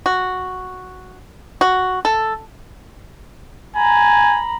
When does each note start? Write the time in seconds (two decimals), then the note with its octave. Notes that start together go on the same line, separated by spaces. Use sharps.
0.06 F#4
1.61 F#4
2.05 A4
3.76 G#5 A#5 B5